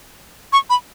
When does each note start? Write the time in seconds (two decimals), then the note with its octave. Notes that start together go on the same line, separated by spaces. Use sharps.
0.53 C#6
0.70 B5